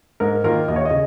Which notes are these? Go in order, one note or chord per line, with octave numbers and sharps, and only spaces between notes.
G#2 A#4
D#3 A#3 F4 A#4
D#2 D#5
C#5
D#5
C#3